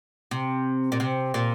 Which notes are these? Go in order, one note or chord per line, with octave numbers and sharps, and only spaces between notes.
C3
A#2
C3
A#2